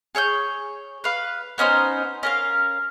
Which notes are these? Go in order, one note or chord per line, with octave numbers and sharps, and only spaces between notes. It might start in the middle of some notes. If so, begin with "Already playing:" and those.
G#4 C#5 E6 G6
B4 F5
B3 C#4 D#4 C5
C#4 A#4 F5